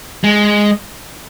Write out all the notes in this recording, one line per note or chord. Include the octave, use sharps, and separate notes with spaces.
G#3